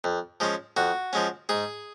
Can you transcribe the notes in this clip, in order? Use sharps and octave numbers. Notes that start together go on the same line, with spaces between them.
F2
F3 G#3 C#4
F2 F#4
F3 G#3 C#4
G#2 G#4